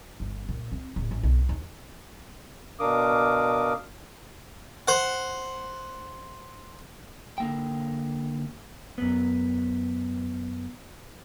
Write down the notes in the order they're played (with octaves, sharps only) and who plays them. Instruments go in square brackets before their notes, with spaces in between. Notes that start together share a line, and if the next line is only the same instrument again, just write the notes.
[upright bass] G1
A#2
C4
D1
A1
B1
D#2
[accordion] B2 D4 A#4 F5 D6 D#6
[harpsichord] C5 F#5
[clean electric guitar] D3 A#3 G5
[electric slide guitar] F#2 B3